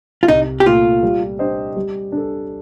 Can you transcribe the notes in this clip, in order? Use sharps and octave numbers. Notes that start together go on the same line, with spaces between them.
F4
C2 D#4
G4
A#2 A3 F4
G3
D4 G4 C5 D#5
G3
D4
A4